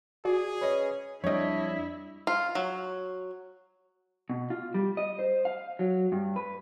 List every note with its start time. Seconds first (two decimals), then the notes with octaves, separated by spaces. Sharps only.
0.25 F#4 G#4 D5
0.61 C#4 B4 C#5 D#5
1.24 F2 G3 D4 E4 C#5 D#5
2.27 F4
2.55 F#3
4.30 B2
4.50 F4
4.74 G3
4.97 D#5
5.19 C5
5.45 F5
5.79 F#3
6.12 G2
6.36 B4